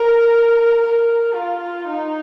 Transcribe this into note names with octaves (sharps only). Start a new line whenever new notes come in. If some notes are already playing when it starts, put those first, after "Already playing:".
Already playing: A#4
A#4
F4
D#4